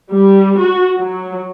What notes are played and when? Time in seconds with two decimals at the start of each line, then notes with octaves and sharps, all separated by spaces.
0.11 G3
0.60 F#4
0.98 F#3